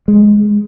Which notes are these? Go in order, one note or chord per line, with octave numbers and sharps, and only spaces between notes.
G#3